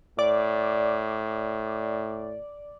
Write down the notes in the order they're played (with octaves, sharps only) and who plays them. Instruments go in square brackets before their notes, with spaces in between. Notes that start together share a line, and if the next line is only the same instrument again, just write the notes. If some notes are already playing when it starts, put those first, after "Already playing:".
[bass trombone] A2 [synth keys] D5